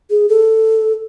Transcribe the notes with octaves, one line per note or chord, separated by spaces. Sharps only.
G#4
A4